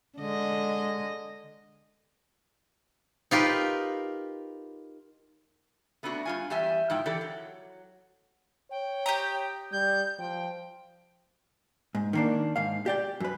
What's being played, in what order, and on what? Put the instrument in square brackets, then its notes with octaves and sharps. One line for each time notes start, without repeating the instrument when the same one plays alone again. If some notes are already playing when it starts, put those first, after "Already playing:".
[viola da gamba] D3 D#5 [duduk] G#3
[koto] D#4 F4 G4 A#4 B4
[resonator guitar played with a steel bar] A3 B3 C4 D4 F#4
G2 F4 G#5
E2 G3 G4 E5 G#5
G#2 F3 E4 G5
E3 G4 A4 D5
F#3
[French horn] C#5 [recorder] G5
[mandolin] G4 D#5 A#5
[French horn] G3 [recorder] G6
[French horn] F3 [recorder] G5
[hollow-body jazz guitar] G#2
D#3 A#3 D4
G#2 F5
G4 D5 G5
F#2 B4